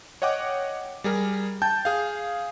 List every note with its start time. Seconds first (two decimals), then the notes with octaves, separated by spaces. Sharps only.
0.22 C#5 D#5 F#5 G5 D6
1.04 G3 G#4 A#4
1.62 G5 A5 G6
1.85 G#4 F5